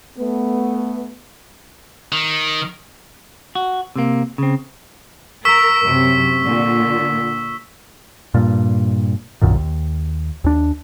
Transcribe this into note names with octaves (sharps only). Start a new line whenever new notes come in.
A3 B3
D#3
F#4
C3 A#3
C#3 C4
A#4 C#6 E6 B6
F#2 C3
A#2 D3
G2 A#2
B1 F#2 A#2 D#3
D#2
D#2 D4